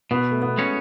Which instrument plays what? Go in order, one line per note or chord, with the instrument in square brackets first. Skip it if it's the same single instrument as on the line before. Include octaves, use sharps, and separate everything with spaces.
[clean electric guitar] B2 [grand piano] B3
[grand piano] A3
B3
[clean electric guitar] G#3 C#4 F#4 C#5